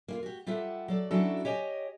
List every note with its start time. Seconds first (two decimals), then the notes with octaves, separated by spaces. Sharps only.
0.08 A#3 E4 F4
0.23 F#4 G4
0.46 G3 F4 G4 A4 E5 F#5
0.88 F#3 A4 D5
1.11 F#3 C#4 D4 E4 F#4 A4
1.45 G4 C#5 D#5 G#5